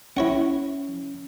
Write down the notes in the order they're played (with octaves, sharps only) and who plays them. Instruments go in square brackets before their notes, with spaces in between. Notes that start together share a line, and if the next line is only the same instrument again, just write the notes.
[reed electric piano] C#4 [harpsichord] E4 C#5 F#5